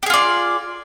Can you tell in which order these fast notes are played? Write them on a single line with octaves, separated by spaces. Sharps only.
G4 G#4 F4 D5